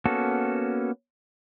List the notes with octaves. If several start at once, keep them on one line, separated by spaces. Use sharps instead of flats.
A#3 B3 C#4 F#4 A4